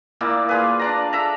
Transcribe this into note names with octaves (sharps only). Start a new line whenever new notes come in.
A#2 A#3 E4 D5
F4 G#4 B4
D4 D5 A#5
A4 E5 A#5